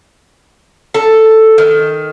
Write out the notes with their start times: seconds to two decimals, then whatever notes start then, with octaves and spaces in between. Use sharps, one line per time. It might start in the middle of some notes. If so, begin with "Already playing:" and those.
0.94 A4
1.58 D#3